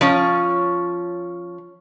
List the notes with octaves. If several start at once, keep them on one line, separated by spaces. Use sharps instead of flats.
F3 C#4 C#5